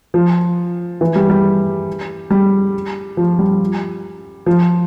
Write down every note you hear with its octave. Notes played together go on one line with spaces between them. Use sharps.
F3
E3
G3
G3
G3
F3
G3
F3